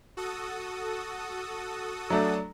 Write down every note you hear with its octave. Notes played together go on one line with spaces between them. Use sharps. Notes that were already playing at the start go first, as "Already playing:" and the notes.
F#4 A4 D#6
F#3 A3 D4